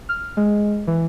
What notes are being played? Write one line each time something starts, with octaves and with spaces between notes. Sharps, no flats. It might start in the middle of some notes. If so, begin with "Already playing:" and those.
F6
G#3
E3